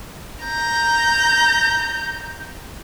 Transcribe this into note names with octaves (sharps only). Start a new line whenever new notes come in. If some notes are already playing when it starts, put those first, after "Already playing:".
A#5 G6